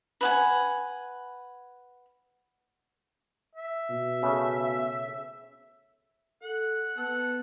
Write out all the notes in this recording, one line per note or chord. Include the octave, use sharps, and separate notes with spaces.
B4 F#5 G#5
E5
B2
C#3 A3
A4 F#5
B3 A4 F#5